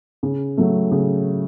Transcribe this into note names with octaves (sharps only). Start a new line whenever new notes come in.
C#3
F#3 A3
C#3